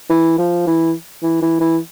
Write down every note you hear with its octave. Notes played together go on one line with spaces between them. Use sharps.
E3
F3
E3
E3
E3
E3